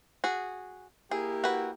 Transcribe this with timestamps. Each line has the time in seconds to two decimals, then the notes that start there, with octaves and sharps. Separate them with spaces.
0.24 F#4 G#4
1.11 A#3 E4 G4 G#4
1.44 F#4 B4